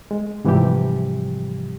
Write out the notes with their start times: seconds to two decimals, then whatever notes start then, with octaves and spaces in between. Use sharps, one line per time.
0.11 G#3
0.45 G#2 C3 E3 F3 G3 G4